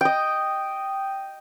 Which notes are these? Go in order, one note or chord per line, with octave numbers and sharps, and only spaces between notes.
D#5 G5